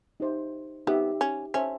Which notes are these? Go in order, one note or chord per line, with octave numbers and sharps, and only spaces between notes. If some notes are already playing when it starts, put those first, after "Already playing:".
D#4 G4 C5 E5
B3 D#4 G4 C5 E5
C#4
C#4 C5 E5 A5